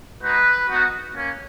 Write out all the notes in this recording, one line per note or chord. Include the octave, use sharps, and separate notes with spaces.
G#3 D#4 F#4 B4
B3 D#4 F#4
A#3 C#4